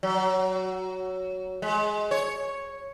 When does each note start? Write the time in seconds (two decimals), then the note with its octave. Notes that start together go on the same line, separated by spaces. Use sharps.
0.03 F#3
1.62 G#3
2.11 C#5